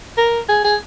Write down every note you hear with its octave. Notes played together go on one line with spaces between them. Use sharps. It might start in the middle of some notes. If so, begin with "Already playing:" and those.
A#4
G#4
G#4